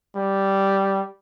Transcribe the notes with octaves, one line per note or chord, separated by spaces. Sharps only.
G3